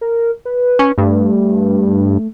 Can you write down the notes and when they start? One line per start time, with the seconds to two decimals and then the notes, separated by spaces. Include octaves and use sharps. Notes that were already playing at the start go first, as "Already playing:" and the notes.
0.01 A#4
0.45 B4
0.79 C#4
0.98 G2 A3